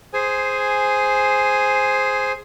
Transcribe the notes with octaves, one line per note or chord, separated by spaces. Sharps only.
G#4 C5 G#5